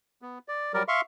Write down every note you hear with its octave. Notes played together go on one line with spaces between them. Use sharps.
B3
D5
F#3 G3 A#4 D5
E5 F5 C6 C#6